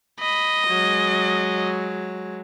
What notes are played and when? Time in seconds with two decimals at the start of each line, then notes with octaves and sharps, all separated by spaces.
0.20 D#5 B5
0.68 F#3 G#3